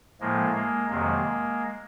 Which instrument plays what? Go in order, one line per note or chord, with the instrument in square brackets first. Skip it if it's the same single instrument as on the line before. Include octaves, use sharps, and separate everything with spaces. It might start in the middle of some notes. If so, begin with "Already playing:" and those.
[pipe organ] A2 F3 G#3 A#3
G#3 A#3
F2 C3 D#3 F#3 G#3 A#3